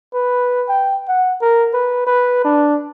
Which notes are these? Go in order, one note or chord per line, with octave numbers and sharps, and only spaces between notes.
B4
G5
F#5
A#4
B4
B4
D4